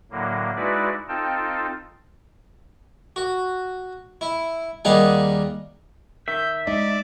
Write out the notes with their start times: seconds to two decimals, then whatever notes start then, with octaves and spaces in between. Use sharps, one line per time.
0.11 A2 D3 F#3 A#3
0.56 G#3 D#4 E4 F#4 B4 D5
1.08 C4 D#4 F4 A4 G5 A5
3.16 F#4
4.21 E4
4.85 D#2 G3 D#4 G#4 F5 F#5
6.28 D#3 E5 G6
6.67 G#3 A3 D#4 D5